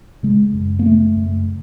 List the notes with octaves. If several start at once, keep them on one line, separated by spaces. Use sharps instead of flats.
C#3 G#3
F#2
A#3
C#3 A3
F#2